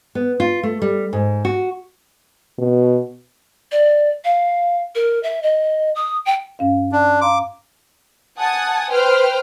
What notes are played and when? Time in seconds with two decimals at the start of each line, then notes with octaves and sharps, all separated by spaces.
0.15 B3
0.40 F4
0.63 A3
0.82 G3
1.13 G#2
1.45 F#4
2.58 B2
3.72 D5
4.24 F5
4.95 A#4
5.23 E5
5.43 D#5
5.95 D#6
6.26 G5
6.59 G2 C#4 F5
6.92 D4
7.21 F5 A#5 C6 D6
8.39 F#5 G#5 A5 D#6
8.91 B4 C5 G5 F6